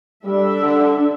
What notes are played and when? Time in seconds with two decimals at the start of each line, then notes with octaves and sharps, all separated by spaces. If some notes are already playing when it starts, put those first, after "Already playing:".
0.24 G3 D4 A4 E5
0.63 D3